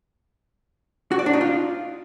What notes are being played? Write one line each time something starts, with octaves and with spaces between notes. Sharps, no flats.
F#4
D5
D4
D#4
F4